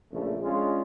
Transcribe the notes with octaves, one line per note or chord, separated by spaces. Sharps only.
A#1 C#3 A3
G#3 C#4 D4 F4